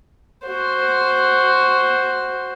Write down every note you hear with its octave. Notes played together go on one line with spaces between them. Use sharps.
F#4 C5